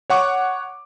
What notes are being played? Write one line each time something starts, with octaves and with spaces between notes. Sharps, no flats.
C#5 F#5 C#6 D6